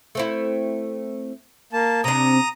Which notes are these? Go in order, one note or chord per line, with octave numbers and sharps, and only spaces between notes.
A3 C4 E4
A#3 A5
C3 D4 A#5 D#6